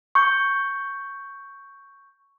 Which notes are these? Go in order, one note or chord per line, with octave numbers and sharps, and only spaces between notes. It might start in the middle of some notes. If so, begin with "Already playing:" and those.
C#6 G6